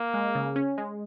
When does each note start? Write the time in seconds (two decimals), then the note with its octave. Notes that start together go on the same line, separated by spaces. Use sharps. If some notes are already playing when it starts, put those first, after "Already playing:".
Already playing: A#3
0.14 G#3
0.35 C#3
0.56 C#4
0.78 G#3